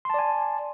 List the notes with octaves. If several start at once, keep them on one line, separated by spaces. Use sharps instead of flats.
D5 G#5 A5 C6